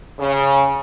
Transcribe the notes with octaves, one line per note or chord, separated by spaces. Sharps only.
C#3